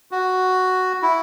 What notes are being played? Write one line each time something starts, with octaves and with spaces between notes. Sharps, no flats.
F#4
E4